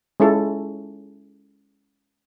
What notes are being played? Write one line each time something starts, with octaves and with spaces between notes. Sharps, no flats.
G#3 C#4 E4 F4 A4